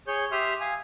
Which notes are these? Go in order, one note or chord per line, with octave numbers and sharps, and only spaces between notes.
G#4 C#5 G6
G4 E5 C6 D#6 F6
F5 G#5 D#6